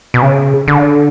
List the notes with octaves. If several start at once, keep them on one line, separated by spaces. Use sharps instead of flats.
B2
C#3
D3